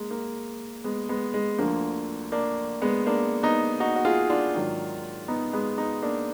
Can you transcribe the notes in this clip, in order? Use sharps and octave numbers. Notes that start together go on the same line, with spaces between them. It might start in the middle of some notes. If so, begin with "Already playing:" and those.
Already playing: G#3 A#3
A#3
G#3 B3
G#3 B3
G#3
D2 D3 F3 A#3
A#3 D4
G#3 B3
A#3 D4
B3 D#4
D#4 F#4
F#4
F4 G#4
D4 F4
G#2 D#3 F#3
B3 D#4
G#3 B3
B3 D#4
A#3 D4